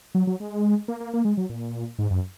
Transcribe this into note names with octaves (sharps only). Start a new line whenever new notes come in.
F#3
F#3
G#3
A#3
A#3
A#3
G#3
F#3
A#2
G#2
F#2